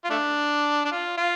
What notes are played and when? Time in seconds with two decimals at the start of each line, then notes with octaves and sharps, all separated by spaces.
0.04 F4
0.10 A3 D4
0.85 D4
0.91 F4
1.17 F4